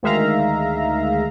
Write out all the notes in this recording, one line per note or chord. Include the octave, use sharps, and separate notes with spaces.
D2 D#3 G#3 E5 F5 A#5